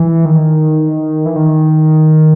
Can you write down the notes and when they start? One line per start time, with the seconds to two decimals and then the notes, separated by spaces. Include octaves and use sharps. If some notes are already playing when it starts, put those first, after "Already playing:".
Already playing: E3
0.25 D#3
1.26 E3
1.36 D#3